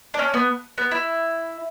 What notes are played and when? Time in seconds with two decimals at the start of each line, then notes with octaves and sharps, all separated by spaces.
0.14 D4
0.19 C#4
0.34 B3
0.78 B3
0.91 E4